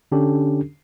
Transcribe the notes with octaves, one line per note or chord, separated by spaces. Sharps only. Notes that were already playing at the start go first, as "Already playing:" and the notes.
D3 C#4 D4 G4 A4